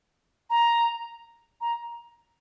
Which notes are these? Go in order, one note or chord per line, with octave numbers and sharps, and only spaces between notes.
A#5
A#5